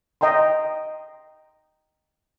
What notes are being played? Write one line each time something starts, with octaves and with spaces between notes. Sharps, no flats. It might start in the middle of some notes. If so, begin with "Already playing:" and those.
D#5 G5 A#5 C6